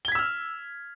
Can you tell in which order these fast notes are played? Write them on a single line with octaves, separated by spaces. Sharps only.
G7 G#6 B6 E6 F6